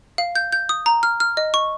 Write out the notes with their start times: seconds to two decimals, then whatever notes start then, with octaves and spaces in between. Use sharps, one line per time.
0.18 F5
0.36 G6
0.52 G6
0.69 D#6
0.86 A#5
1.03 F6
1.20 F6
1.37 D#5
1.54 C#6